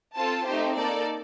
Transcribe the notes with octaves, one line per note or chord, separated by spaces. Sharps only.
C4 F4 A4 A5
A3 C4 D#4 G4 C5
A#3 D#4 A4 D5